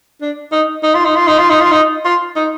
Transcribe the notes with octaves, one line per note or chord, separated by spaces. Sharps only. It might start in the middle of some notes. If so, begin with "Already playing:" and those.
D4
D#4
D#4
F4
D#4
F4
D#4
F4
D#4
F4
D#4
F4
D#4